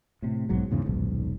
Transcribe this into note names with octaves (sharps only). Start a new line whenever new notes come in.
A2 C3
B1 G#2 F#3
E2 G#2 C#3 E3
D#1 B1 G#2